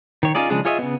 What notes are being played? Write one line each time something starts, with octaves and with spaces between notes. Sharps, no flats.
D#3 C#5
C#4 D#4 F4 G#4 D5
C#3 F3 G#3 D4 G#4
F4 G#4 C#5 D#5 E5
C#3 B3